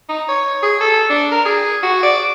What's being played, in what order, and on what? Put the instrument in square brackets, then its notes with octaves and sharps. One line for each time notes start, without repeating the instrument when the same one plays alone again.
[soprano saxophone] D#4
C#5
G#4
A4
D4
A#4
G#4
F#4
D5